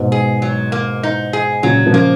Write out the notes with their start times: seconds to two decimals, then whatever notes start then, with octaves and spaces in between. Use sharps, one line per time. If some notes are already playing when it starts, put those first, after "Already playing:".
Already playing: G#2 B2
0.12 G#4
0.42 F#3
0.72 A#3
1.03 D#4
1.33 G#4
1.63 A#2 C#3 F#3
1.87 C#3 F3
1.94 A#3